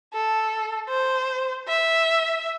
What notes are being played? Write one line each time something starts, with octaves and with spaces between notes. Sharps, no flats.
A4
C5
E5